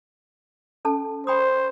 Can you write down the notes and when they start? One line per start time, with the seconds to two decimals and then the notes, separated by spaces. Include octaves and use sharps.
0.85 C#4 A4 A5
1.27 C5 G5 B5 D#6